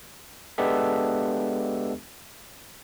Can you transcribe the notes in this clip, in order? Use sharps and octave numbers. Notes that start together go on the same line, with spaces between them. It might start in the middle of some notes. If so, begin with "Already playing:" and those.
G#3 B3 D4 G4 A4 E5